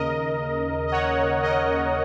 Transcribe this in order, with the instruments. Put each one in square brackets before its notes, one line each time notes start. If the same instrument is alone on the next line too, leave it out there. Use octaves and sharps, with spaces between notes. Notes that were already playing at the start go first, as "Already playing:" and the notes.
Already playing: [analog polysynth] D#2 C#3 A#4 D#5
D#5
C#5 F#5
A#4 D#5